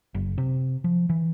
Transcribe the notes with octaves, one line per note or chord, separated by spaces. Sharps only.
F#1
C3
F3
E3